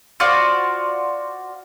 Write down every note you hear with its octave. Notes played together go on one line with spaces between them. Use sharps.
F4 F#4 C5 D5